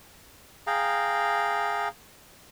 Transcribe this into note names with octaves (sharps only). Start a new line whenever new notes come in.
G#4 F5 G5 A#5